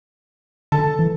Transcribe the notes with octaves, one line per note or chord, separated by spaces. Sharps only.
D3 A4 A5
E3